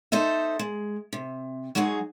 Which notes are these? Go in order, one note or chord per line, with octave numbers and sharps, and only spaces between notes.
D#4 A4 C5 D#5 E5
G#3
C3
F#3 G#3 D#4 F#4 G#4